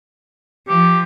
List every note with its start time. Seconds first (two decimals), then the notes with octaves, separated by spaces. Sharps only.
0.68 F3 G4